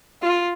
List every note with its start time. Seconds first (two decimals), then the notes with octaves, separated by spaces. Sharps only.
0.22 F4